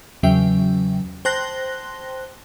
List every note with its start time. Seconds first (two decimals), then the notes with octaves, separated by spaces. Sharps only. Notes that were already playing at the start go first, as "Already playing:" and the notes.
0.23 E2 C#3 F#3 E5 G5
1.25 C5 G5 A5 C6 F#6 A#6